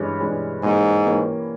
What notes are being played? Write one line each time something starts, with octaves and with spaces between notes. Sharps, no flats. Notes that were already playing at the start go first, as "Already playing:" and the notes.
Already playing: G2 E3 G#3 C#4
G2 E3 G#3 C#4
G#2 E3 A#3 C#4 G4
E3 A#3 C#4 G4